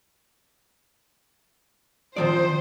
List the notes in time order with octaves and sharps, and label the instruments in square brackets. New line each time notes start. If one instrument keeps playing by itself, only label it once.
[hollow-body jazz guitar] D#3 F3 D5 [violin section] C5